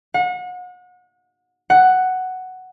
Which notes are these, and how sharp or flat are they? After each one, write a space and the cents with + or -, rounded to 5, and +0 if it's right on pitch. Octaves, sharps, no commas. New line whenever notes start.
F#5 -35
F#5 +5